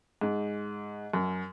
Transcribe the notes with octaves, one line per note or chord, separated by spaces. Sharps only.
G#2
F#2